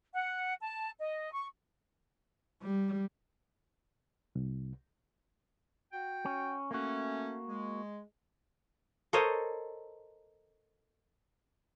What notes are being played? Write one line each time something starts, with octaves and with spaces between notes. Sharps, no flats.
F#5
A5
D#5
C#6
G3
C2
F#4 G5
C#4
A3 A#3 C#4 F#4
G#3
A4 A#4 C5 C#5 D#5